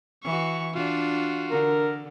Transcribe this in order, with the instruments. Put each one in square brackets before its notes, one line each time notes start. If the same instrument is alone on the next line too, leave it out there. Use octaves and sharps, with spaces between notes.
[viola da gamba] E3 F#4 [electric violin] C#6
[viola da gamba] D4 [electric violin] F4 F#4
[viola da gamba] D3 [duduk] A#4